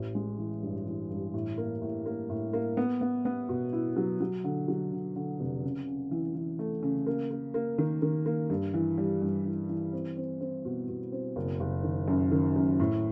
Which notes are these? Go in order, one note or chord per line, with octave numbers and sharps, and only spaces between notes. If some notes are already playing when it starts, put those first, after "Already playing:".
Already playing: A1
G#3
E3
G2
E3
G2
A2
A#3
A2
A#3
A2
A#3
B3
B3
B3
B2
E4
F#3
F#3
D3
F#3
D3
D3
F1
C#3
C#3
E3
E3
A3
C#3
A#3
A#3
A#3
D#3
D#3
A#3
G2
E3
G3
G2
E3
E3
C4
C4
C4
B2
B2
C4
F#1
F#1
D#3
F#2
D#3
F#2
A2